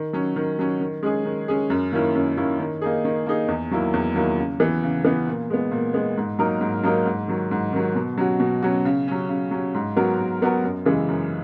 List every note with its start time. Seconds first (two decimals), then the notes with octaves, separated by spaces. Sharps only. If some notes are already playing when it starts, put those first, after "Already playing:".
Already playing: D#3
0.13 F#3 C#4
0.36 D#3
0.59 F#3 C#4
0.81 D#3
1.03 G#3 C#4 G#4
1.25 D#3
1.48 G#3 C#4 G#4
1.70 F#2
1.93 D#3 A#3 C#4 E4
2.15 F#2
2.37 D#3 A#3 C#4 E4
2.59 D#3
2.82 A#3 D#4 G#4
3.05 D#3
3.26 A#3 D#4 G#4
3.48 E2
3.71 D#3 F#3 A#3 E4
3.94 E2
4.15 D#3 F#3 A#3 E4
4.38 C#3
4.60 E3 B3
4.83 C#3
5.05 E3 B3
5.27 A#2
5.50 G#3 B3
5.71 A#2
5.94 G#3 B3
6.17 G#2
6.39 F#3 A#3 D#4 A#4
6.61 G#2
6.83 F#3 A#3 D#4 A#4
7.05 G#2
7.28 D#3 F#3
7.51 G#2
7.73 D#3 F#3
7.95 B2
8.17 F#3 C#4 F#4
8.40 B2
8.63 F#3 C#4 F#4
8.85 C#3
9.08 F#3 C#4
9.29 C#3
9.51 F#3 C#4
9.74 G#2
9.96 F#3 B3 F#4 A#4
10.19 G#2
10.42 F#3 B3 F#4 A#4
10.64 F#2
10.85 C#3 E3 G#3
11.08 F#2